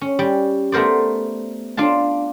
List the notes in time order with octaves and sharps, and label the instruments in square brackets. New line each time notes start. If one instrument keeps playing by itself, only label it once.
[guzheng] C#4
G3
A3 B3 A#4 C5 D5
D4 F4 F5 A5